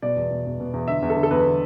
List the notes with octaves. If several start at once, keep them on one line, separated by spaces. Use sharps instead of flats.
B2 D5
E2
B2
E2
B2
E2
D3 E5
E2
A4
D3
A4
E2 B4
D3